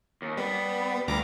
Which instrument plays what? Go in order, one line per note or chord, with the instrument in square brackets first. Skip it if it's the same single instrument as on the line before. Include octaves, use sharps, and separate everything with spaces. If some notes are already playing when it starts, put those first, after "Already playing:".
[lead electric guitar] D#2
[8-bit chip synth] G3 [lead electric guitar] B3
[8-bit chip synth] D2 A#5 D6 [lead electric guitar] G2